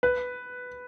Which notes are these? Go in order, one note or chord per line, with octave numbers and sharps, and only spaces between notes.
B4